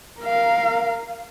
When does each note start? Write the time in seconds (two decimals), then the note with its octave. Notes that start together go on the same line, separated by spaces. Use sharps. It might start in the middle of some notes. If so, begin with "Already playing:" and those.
0.20 A#4 F5